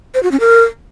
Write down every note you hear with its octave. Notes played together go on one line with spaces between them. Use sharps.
C5
F#4
C#4
A#4